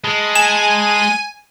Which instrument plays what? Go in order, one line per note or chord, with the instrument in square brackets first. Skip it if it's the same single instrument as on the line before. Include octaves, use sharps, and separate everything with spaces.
[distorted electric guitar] G#3 [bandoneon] A5 B5 D#6
[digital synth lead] G#5 [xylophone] E7